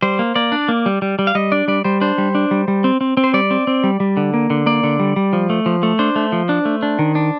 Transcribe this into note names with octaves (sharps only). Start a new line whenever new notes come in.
G3 C5
A#3
A#3 D5
D4
A#3
G3
G3
G3
F5
G3 D#5
D4 D5
G3 D5
G3 C5
D4 C5
G3
D4
G3
G3
C4
C4
C4
C5
G3 D5
C4
C4
G3
G3
D3
A#3
D3
A#3 D5
D3
G3
G3
F3
A3
F3
A3
D4 C5
A3
F3
D4
A3
D4
D#3
D4